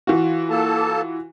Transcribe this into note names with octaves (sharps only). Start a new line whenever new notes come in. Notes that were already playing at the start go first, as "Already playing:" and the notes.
E3 F4 F#4
A#3 A4 A5